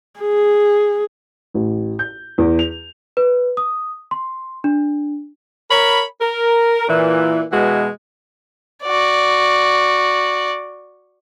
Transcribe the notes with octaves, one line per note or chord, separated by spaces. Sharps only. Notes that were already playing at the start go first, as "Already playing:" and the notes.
G#4
A1
G6
E2
F7
B4
D#6
C6
D4
A#4 C#5 B5
A#4
A#2 E3
B2 E3 G#3 F#4
F#4 D5